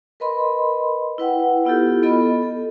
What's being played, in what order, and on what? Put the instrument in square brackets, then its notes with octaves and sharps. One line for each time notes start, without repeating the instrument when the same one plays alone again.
[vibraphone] A#4 B4 D#5 B5 C6
E4 B4 F#5 G5
B3 E4 F4 G4 A4
B3 F4 A4 D#5 B5
A4